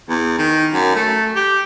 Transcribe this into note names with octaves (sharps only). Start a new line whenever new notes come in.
E2
D#3
F#2
A3
G4